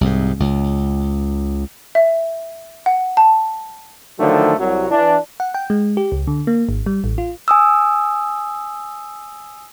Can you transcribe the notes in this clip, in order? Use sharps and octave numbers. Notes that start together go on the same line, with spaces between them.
C2 G#2
C#2
E5
F#5
A5
D3 D#3 F3 F#3 A3
C2 F#3
E3 D4
F#5
G5
G#3
G4
C#2
D3
A#3
G#1
G3
A1
F4
G#5 D#6 E6